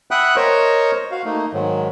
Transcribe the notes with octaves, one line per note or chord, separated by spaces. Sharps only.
E5 F#5 G5 B5 D#6 F#6
A#4 C5 C#5 D#5 C#6
F#4 F5
A3 A#3 D#4
G#2 D#3 F#3